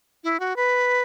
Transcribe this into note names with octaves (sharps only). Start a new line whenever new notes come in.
E4
F#4
B4